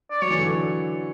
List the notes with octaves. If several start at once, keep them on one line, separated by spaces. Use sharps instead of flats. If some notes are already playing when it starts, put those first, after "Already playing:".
D5
F#3 C#5
E3
D3